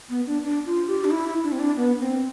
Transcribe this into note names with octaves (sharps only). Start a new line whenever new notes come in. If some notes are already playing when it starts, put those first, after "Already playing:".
B3
D4
D4
F4
G4
D4
E4
D4
C4
D4
B3
C4